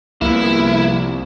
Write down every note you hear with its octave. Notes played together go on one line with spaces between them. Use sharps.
C2 F3 A#3 B3 E4